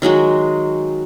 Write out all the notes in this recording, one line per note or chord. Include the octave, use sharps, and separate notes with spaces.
D#3 F#3 G#3 F#4